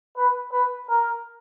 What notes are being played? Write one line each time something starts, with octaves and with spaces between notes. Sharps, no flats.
B4
B4
A#4